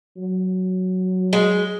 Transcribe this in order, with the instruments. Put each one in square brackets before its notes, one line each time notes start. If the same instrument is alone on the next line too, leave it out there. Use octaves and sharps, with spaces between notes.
[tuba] F#3
[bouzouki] G#3